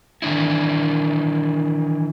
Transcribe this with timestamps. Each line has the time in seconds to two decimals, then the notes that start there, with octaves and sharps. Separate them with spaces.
0.22 D#3 E3 D4 E4